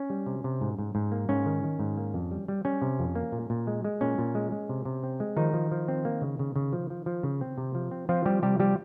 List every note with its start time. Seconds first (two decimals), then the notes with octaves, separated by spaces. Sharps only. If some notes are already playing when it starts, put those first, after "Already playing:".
Already playing: C#4
0.10 G3
0.26 C3
0.44 C3
0.61 G#2
0.79 G#2
0.95 G#2
1.12 A#3
1.29 G#2 C#4
1.46 D#3
1.64 D#3
1.79 G#2
1.97 A#3
2.14 F2
2.31 G3
2.48 G3
2.65 G3 C#4
2.82 C3
2.99 F2
3.15 A#3
3.32 A#2
3.50 A#2
3.67 G#3
3.84 G#3
4.01 A#2 C#4
4.18 A#2
4.35 G#3
4.52 G#3
4.69 C3
4.85 C3
5.03 C4
5.20 G#3
5.37 D#3 F3 D#4
5.54 F3
5.71 F3
5.88 C4
6.05 A#3
6.22 C#3
6.39 C#3
6.56 C#3
6.73 F3
6.90 F3
7.06 F3
7.23 C#3
7.41 C4
7.58 C3
7.75 F3
7.91 C4
8.09 F3 C4 F4
8.25 F3 G3 G4
8.42 C3 G3 G4
8.59 F3 G3 G4